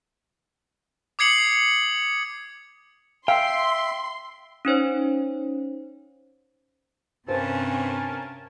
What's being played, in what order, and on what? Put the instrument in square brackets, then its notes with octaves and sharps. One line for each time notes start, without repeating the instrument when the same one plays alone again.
[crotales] D6 D#6 G#6 C7 C#7 F#7
[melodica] E5 [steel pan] F5 [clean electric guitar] G5 [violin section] C6
[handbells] C#4 D#4 C5 C#5
[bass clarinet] G2 [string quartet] C3 C4 C#4 [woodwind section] A#4 G#5 A5 [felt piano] C5